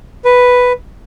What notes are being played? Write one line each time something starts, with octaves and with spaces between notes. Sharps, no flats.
B4